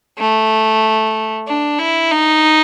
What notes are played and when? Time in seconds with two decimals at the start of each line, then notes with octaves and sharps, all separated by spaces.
0.18 A3
1.47 D4
1.79 E4
2.12 D#4